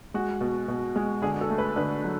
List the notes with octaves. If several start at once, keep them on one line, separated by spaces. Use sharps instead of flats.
G#3 F#4
B2
B2
G#3
D3 G#4
A4
A3
B4
D3 B4
F#3